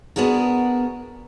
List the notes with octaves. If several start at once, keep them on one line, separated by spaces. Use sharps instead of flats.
B3 D4 F#4 G#4 A#4